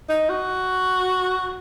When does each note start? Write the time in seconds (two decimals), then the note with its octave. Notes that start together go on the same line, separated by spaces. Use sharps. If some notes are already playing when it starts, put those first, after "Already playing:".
0.09 D#4
0.29 F#4